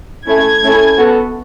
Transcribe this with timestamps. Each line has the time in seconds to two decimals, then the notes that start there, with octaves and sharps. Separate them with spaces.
0.27 A3 C#4 E4 G#6
0.63 A3 C#4 E4 A4
0.98 B3 F#4 A4